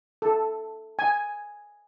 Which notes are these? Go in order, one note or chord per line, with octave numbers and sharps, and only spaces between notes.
A4
G#5